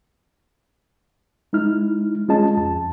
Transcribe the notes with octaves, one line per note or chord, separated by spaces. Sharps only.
G#3 D#4 E4 F6
G#3 C#4 F4 G#4 D#5 A5
F2 A5